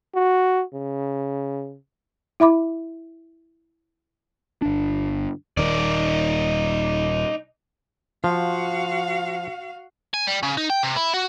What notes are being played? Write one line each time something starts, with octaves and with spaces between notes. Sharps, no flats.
F#4
C#3
E4 E5 B5 D6
G1 D4
D#1 D#3 D#4 D5
F3 F#4 F5
G#5
G3
C#3
D#4
G5
C3
E4
F#4